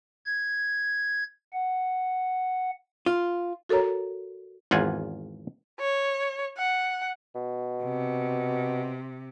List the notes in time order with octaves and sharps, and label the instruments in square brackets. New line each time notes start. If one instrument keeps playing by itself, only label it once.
[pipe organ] G#6
F#5
[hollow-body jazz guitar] F4
[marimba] F#4 A4 A#4 C#5 A#5
[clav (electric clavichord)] G#1 E2 F4 F#5 G#5
[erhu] C#5
F#5
[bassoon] B2
[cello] C3